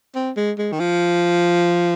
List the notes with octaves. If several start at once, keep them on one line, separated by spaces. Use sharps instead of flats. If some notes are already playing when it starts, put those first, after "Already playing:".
C4
G#3
G#3
D#3
F3